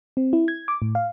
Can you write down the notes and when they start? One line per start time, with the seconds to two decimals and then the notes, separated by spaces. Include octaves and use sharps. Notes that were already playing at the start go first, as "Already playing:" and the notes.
0.17 C4
0.33 E4
0.48 G#6
0.68 D6
0.82 A2
0.95 F5